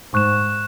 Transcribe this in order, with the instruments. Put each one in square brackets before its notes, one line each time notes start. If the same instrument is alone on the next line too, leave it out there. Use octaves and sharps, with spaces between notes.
[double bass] G#2 [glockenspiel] C#6 F#6 E7